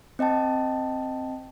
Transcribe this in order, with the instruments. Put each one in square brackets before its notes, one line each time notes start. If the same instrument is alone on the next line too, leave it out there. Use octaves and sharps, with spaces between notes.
[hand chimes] C4 D#5 G5 A5